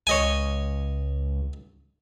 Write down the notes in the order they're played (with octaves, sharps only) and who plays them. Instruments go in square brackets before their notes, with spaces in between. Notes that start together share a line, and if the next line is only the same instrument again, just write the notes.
[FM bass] C#2 [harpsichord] C#5 D#5 G#5